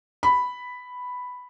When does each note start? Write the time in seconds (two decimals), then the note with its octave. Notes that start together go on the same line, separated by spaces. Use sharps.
0.23 B5